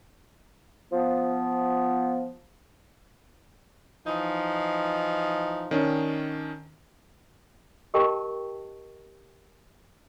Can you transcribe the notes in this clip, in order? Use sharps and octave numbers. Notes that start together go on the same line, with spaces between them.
F3 B3
E3 F3 D#4
D#3 C#4 D4
G4 A#4 D#5 G5 A5 C#6